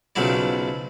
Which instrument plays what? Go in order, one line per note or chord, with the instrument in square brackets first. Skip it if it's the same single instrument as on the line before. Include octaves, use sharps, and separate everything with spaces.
[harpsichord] B1 C#3 F3 F#3 E4 D5